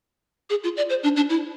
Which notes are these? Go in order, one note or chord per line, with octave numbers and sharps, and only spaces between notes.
G#4
F4
D5
C5
D4
D4
E4